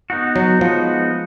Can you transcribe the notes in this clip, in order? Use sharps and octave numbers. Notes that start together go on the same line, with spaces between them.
B3 D#4 F#4
F#3
F3 G#3 B3 D#4 F#4